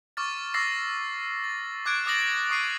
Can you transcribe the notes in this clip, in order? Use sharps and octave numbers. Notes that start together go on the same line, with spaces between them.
C#6 D6 F6 A6
C#6 D6 E6 A6 A#6 C7
A6
D6 F#6 G#6 D7
D6 D#6 A6 A#6 F#7
C#6 D#6 C7 D#7